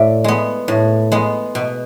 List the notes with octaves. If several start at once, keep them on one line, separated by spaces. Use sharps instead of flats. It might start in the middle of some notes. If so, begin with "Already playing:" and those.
Already playing: A2 D5 E5
G#3 B3
A2
G#3 B3
B2